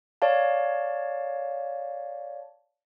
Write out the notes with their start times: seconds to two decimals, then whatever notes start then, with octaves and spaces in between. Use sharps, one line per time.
0.22 C#5 D5 F5 A5